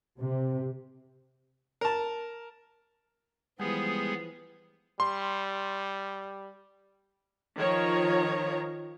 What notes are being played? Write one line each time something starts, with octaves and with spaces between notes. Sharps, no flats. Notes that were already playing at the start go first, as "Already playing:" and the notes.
C3
A#4 A5
E3 F3 G3 G#3 B3 G#4 B4
G3 C6
D#3 F3 C#5 A#5